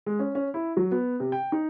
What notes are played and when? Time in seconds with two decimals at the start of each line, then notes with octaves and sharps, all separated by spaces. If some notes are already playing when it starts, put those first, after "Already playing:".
0.06 G#3
0.19 C#4
0.35 C#4
0.54 E4
0.77 F#3
0.92 B3
1.20 C3
1.32 G5
1.52 D#4